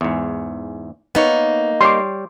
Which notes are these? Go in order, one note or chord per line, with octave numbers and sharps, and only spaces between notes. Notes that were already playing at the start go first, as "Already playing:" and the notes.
E2 G#2
A#3 B3 D#4 C#5
G3 C#5 C6 D6